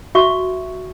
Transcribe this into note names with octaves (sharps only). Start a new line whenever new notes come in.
F#4 E5 C#6